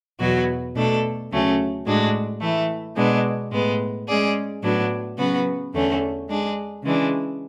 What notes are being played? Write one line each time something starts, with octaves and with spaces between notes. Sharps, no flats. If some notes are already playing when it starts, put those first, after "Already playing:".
E2 B2 F#3 B3 F#4
B2 A3 D4 A4
D2 C#3 F#3 A3 C#4
A2 G#3 D4 F#4
E3 A3 E4
B2 G#3 B3 D4
A2 G#3 B3
G#3 C#4 G#4 D5
A2 F#3 B3 D4
C#3 F#3 B3 F#4 B4
E2 D3 A3 C#4
G#3 D4 G#4
C#3 E3 G#3 D4